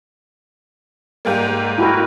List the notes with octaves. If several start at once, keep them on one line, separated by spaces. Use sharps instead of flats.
G#2 G3 A#3
E4 F#4 A#4